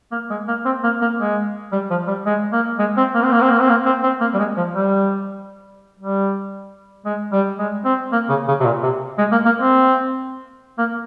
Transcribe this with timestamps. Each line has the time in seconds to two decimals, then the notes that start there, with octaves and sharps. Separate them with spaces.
0.12 A#3
0.30 G#3
0.48 A#3
0.65 C4
0.84 A#3
1.01 A#3
1.19 G#3
1.72 G3
1.90 F3
2.07 G3
2.26 G#3
2.52 A#3
2.79 G#3
2.97 C4
3.15 A#3
3.24 C4
3.32 A#3
3.41 C4
3.50 A#3
3.60 C4
3.69 A#3
3.86 C4
4.03 C4
4.21 A#3
4.34 G3
4.39 G#3
4.57 F3
4.74 G3
5.99 G3
7.05 G#3
7.32 G3
7.59 G#3
7.85 C4
8.12 A#3
8.29 C#3
8.48 C#3
8.60 C3
8.66 A#2
8.83 C3
9.18 G#3
9.32 A#3
9.45 A#3
9.58 C4
10.78 A#3